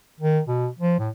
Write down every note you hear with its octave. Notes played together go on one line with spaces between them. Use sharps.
D#3
B2
F3
A2